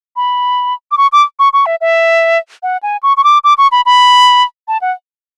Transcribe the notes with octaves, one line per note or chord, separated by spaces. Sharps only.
B5
D6
C#6
D6
C#6
C#6
E5
E5
F#5
G#5
C#6
C#6
D6
D6
C#6
B5
B5
A5
F#5